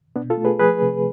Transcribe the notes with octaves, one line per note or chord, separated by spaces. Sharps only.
B2 B3 D4
F4 A4
A3
G#4 B4
F3 G#4 B4
C3